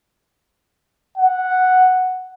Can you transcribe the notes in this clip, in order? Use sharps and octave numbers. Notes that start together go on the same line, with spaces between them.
F#5